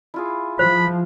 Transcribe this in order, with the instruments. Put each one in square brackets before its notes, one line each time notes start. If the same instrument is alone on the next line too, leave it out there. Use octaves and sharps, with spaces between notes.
[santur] E4 F4 G#4
[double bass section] F3 [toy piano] C5 [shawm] B5